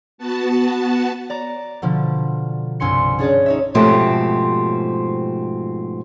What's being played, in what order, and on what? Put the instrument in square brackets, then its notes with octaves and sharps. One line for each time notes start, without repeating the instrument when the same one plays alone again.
[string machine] B3 F#4 A5
[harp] D5 A#5
B2 D3 F3
C2 G2 G#5 C6 C#7
C#4 D4 G#4 C#5 D5
D#4 C#5 E5
[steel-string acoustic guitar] G#2 B2 F3 A3 C4 G4